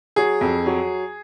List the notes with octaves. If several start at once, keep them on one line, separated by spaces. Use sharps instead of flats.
F#3 G#4
F2
F#3